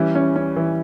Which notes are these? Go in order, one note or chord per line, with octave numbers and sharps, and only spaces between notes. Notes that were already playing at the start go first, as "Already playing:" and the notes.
Already playing: E3 G3 C#4
C#4
C#4
E3